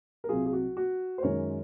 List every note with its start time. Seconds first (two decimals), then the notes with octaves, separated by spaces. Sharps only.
0.24 A#4
0.29 C2 C3 F#3 F4 G#4
0.46 G#4
0.53 F#4
0.77 F#4
1.18 C5
1.23 F#2 D#3 G#3 A#4 C#5